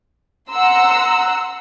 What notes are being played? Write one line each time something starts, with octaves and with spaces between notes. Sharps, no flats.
F#5 A#5 C6 E6